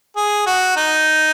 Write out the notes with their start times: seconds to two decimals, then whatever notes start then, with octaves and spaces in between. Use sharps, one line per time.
0.17 G#4
0.47 F#4
0.77 D#4